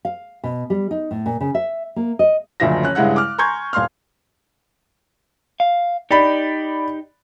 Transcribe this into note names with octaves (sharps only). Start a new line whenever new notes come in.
F5
B2
G3
D#4
A2
A#2
C#3
E5
A#3
D#5
F#1 D2 D3 F3 E5 A#6
C#4 F#6
G2 C#3 G#3 E4 F#5 F#6
D6 F6
G#5 A#5 C6 C#6 G6 G#6
D#1 F5 C6 F6
F5
D#4 G4 D5 B5